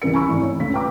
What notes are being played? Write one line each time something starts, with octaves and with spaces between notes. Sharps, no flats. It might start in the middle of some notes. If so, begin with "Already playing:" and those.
C#2 E3 G3 A#4 C#7
G#5 A#5 B5 C#6 E6
G#1 E3 A3 E4
C#5
C#2 G2 A3 F5 B6
F4 B4 G5 A#5 D6